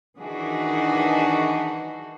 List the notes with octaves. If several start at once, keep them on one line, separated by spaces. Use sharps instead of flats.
D#3 E3 D4 D#4 F#4 G#4